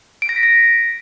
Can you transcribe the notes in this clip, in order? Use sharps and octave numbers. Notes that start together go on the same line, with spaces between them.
D7
A#6
B6
A#6